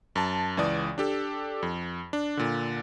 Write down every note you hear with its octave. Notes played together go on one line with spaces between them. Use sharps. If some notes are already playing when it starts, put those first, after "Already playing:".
F#2 A5
C#2 E3 D5 D#6
D4 G4 A4
F2
D4
A#2 D3